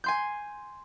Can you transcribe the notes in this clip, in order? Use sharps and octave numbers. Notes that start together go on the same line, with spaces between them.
G#5 C6 G6